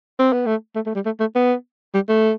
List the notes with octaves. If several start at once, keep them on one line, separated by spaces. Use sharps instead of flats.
C4
B3
A3
A3
A3
G3
A3
A3
B3
G3
A3